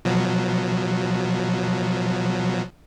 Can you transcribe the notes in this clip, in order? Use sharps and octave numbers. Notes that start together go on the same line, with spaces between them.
B2 F3 F#3